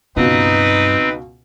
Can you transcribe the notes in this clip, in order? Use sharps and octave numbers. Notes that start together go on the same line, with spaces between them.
C#2 G2 B2 C4 D#4 B4